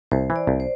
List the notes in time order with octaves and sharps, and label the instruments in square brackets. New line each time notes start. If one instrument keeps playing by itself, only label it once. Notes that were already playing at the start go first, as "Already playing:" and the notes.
[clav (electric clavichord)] C2 [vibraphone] C5
[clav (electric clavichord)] E3
[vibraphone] D5
[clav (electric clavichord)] C2
[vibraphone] C5